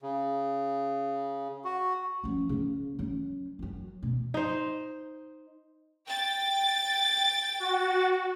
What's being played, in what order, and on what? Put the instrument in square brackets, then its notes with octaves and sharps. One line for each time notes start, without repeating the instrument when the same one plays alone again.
[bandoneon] C#3
F#4
[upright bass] F3 C#4
C#3 A#3
F#3 C#4
F#2 F#3
B2
[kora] D#4 C5
[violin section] G5 A6
[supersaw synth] F#4